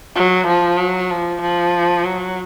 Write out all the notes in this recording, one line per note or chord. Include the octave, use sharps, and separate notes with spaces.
F#3
F3
F#3
F3
F3
F#3